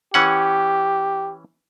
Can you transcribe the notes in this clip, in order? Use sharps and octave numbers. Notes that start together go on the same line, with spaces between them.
E3 C#4 G4 F#5